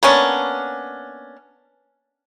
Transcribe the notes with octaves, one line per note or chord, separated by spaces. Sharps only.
A#3 B3 C#4 D4